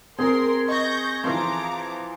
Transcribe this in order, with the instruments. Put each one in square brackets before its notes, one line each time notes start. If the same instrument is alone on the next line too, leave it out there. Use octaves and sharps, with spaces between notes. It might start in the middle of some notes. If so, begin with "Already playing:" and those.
[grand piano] C4 [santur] G#4 [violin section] A#4 C6
[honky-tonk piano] D#5 [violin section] C#6 G6 A#6
[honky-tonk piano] E3 F3 [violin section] A#5 D6 [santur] C6